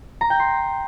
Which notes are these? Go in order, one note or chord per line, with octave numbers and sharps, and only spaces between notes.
A#5
G5
C6